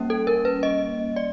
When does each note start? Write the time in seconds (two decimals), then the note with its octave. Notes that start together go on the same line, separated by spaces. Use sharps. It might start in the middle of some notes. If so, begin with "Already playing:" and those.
Already playing: G3 A#3 C#4
0.10 A4
0.27 A#4
0.45 B4
0.63 D#5
1.16 D5